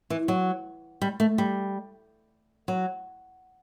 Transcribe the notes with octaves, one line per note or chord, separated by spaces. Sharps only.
E3
F#3
G3
A3
G3
F#3